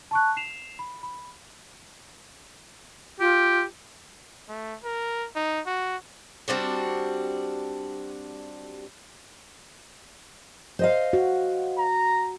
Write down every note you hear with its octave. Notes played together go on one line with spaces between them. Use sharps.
A5 C#6 F#6
C7 E7 F7
B5
B5
F4 G4
A3
A#4
D#4
F#4
G3 C4 D4 F#4
C5 D#5 F5
F#4
A#5